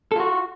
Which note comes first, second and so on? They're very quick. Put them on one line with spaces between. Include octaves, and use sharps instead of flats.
A4 F4 F#4